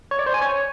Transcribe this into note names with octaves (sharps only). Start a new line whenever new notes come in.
C#5
D5
C5
G#5
C#5